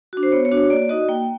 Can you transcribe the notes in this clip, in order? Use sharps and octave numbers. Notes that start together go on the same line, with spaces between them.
D4 F#4
C5
B3 C#5
C#5
D4 F#4
C#5
A#3 D5
D#4 F#4 D#5
A#3 G5